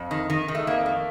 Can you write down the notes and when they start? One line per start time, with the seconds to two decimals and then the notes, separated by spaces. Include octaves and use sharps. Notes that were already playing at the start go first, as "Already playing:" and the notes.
Already playing: F2
0.11 D#3
0.30 D#3
0.48 D#3
0.55 A3
0.67 F2 A#3
0.86 A3